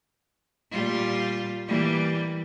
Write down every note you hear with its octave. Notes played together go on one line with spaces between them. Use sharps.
A#2 G3 F4
E3 G3 A#3